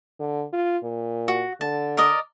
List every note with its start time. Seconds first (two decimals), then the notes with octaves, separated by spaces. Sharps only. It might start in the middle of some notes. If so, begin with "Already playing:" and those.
0.20 D3
0.53 F4
0.83 A#2
1.28 F#4
1.61 D3 A5
1.97 A#4 D5 D#5